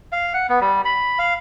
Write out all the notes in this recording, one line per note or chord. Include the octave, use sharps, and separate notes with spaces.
F5
F#5
B3
G3
B5
F5